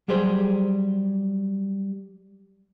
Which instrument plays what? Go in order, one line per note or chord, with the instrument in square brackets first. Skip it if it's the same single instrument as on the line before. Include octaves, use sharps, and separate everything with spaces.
[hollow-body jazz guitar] F#3 G3 G4 G#4 C5